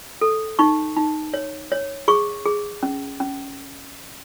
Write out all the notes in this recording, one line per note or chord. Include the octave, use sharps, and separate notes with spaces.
A4
D#4 C#6
D#4
C#5
C#5
G#4 C#6
G#4
C#4
C#4